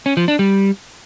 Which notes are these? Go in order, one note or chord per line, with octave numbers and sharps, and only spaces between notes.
C#4
F3
D4
G3